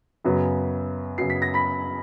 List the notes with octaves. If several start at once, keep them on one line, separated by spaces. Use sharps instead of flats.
F#2 C#3 F#3 B3
F#2 C#3 F#3 B3 C7
B6
A#6
B5 B6